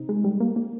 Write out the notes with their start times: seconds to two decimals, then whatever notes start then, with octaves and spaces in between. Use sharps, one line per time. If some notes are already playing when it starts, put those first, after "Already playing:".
Already playing: C3 D#4
0.09 G#3
0.24 G3
0.40 A#3
0.56 A#3